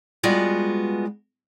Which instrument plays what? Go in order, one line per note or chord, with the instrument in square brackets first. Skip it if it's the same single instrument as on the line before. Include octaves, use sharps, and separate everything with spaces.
[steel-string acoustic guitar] G3 G#3 B3 F4 F#4